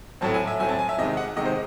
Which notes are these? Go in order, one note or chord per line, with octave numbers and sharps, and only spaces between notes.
A2 F#3 C4 A5
G#5
E5
A2 F#3 C4 G#5
A5
G#5
E5
C3 D#3 G#3 D#5
F#5
C3 D#3 G#3 D#5
C5